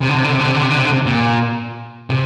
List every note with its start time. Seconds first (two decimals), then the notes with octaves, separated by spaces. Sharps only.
0.02 C3
0.09 D3
0.17 C3
0.24 D3
0.33 C3
0.40 D3
0.47 C3
0.55 D3
0.62 C3
0.70 D3
0.78 C3
0.85 D3
0.93 C3
1.06 A#2
2.10 C3